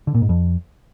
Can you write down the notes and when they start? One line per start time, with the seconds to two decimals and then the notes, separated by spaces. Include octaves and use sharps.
0.07 D3
0.15 A#2
0.22 G#2
0.29 F2